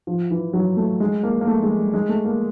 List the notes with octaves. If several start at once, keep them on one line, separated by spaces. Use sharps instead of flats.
F3
E3
F#3
A3
G#3
A#3
A#3
A3
G#3
G3
G#3
A3
A#3